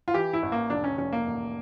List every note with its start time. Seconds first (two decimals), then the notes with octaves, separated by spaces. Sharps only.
0.08 F4
0.14 E3 G4
0.33 E4
0.43 A1
0.52 A#3
0.70 F1 D4
0.84 C#4
0.98 F1 C#4
1.13 A#3
1.27 A1